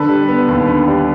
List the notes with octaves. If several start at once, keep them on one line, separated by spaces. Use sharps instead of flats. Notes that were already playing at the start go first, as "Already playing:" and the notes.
Already playing: D3 A4 B4
G3
B3
D#2
D3
G3